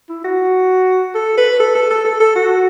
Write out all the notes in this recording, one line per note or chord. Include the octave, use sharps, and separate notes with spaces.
E4
F#4
A4
B4
A4
A4
A4
A4
A4
F#4